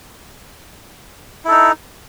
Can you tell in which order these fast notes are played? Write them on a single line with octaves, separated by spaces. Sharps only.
E4 A4 D#4